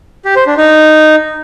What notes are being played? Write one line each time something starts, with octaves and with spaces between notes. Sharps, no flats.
G4
C5
D4
D#4